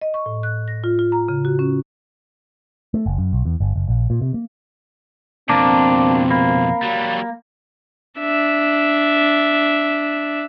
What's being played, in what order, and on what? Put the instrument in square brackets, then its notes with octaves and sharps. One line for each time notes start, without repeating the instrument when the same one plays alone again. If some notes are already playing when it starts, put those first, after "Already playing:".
[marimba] D#5
C#6
A2
F#6
A#6
F4
F4
A#5
C#3
F#4
C#4
[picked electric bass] A3
F#1
F#2
B1
E2
G1
F#1
A#1
A#2
C3
A#3
[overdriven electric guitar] F2 B2 [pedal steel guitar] A#3 D4 [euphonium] C4 [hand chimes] A5 A#5 D6
[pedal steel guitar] A#3 [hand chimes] B5
[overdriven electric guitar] F#3 G3
[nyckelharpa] D4 E5